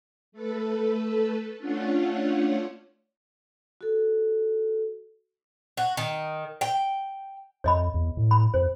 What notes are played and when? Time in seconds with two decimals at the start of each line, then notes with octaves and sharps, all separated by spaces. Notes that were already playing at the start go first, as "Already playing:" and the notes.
0.32 A3 A4 B4
1.58 A3 C#4 D4 F4 C#5 F#5
3.81 F#4 A4
5.77 F#4
5.97 D#3
6.61 G5
7.64 F2 C#5 D#5 B5
7.94 E2
8.17 A2
8.31 B5
8.54 F2 C5